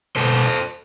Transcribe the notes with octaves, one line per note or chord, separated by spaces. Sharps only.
B2 A4 C5